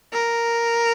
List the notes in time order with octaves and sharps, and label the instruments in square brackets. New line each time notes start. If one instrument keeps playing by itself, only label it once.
[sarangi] A#4